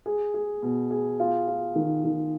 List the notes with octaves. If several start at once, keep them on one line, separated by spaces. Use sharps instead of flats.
G#4
G#4
B2
G#4
F4
F4
D#3
D#3